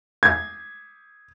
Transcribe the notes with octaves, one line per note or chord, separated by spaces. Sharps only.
G#6